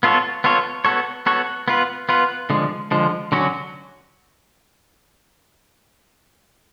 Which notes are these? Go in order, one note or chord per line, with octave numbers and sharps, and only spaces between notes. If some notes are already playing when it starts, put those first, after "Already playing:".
B3 F4 A4 C#5
B3 F4 A4 C#5
B3 F#4 A4 C#5
B3 F#4 A4 C#5
B3 F4 B4
B3 F4 B4
D3 F3 G#3
D3 F3 G#3
D3 F#3 C#4 F#4